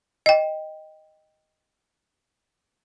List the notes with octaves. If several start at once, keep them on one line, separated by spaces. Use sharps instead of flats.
D#5 G5